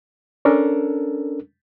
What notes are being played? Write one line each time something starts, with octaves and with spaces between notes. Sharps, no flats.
C#4 D4 A4 A#4